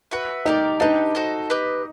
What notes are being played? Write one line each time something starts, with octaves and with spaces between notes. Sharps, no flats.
F#4 B4 E5
D#4 G4 A#4 D5
D4 D#4 G4 B4
F#4 A4 C5 D#5
G4 B4 D#5